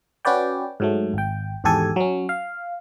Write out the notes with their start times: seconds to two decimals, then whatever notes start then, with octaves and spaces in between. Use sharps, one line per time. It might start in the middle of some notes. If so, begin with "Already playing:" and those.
0.25 C#4 F#4 B4 D5 G5
0.80 G#2 F#3 A3
1.14 G#1 G5
1.64 G#1 E2 G#2 G4 A4 G#5
1.96 F#3 C#4
2.29 F5